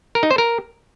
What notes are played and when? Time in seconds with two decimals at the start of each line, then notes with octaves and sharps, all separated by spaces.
0.15 A#4
0.23 D#4
0.31 C5
0.38 A#4